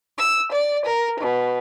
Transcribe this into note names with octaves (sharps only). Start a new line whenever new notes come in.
E6
D5
A#4
B2